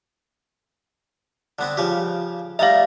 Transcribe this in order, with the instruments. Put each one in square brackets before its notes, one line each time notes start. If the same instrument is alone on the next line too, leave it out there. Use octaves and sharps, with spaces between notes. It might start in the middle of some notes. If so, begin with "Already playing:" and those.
[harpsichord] D3 B3 C4
C#3 F3 G4
[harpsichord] G3 A3 D#4 [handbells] E5 F5